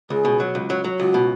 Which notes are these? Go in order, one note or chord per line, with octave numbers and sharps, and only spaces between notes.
C#2 G#4
B2
F#3
C#2
F#3
F#3
C#2 F#4
B2